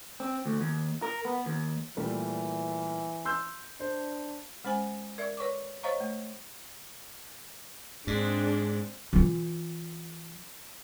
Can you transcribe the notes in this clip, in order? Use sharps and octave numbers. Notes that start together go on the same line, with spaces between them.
C4
D2
D#2
A#4
B3
D#2
A#2 E3 G3 A3
C6 E6 G6
D4 C5
G#3 C#4 C5 G#5
A#4 D5 E5
B4 C#5 C#6 D6
C5 C#5 D#5 F5 A#5 C#6
A3
G#2 G#3 C4 D4
E3 F4